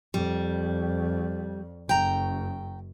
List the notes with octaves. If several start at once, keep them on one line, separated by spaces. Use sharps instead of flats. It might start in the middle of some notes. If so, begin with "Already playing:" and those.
F2 G3
F#1 F#2 G5 A#5